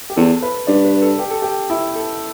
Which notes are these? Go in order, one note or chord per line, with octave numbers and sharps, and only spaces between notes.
G4
E2 A4
B4
G2 D5
B4
A4
G4
A4
G4
E4
A4